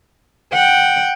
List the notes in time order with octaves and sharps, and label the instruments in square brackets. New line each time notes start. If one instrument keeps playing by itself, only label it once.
[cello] F#5 G5